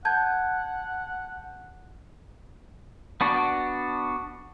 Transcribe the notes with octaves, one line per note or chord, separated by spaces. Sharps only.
F#5 A5 G6 G#6
B3 D4 F#4